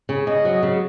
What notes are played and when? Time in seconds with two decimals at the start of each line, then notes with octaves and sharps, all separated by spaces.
0.09 C#3
0.27 C#3 D#5
0.45 F#3
0.63 C#3